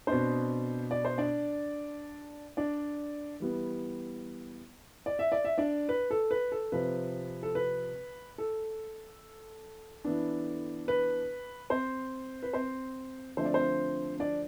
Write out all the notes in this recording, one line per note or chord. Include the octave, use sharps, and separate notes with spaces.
B2 B3 C4 D4 C5
D5
C5
D4 D5
D4 D5
E3 G3 B3
D5
E5
D5
E5
D4 D5
B4
A4
B4
A4
C3 F3 C4 B4
A4
B4
A4
E3 B3 D4
B4
C4 C5
B4
C4 C5
D3 F3 A3 C4 C5
D5
C4 C5
D4 D5